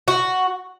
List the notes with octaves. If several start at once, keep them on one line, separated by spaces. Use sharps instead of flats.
F#4